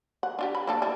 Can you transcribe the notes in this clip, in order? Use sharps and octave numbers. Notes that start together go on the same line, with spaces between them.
F#5
D4 F4 G4
B5
A#3 D4 A4
E3 D4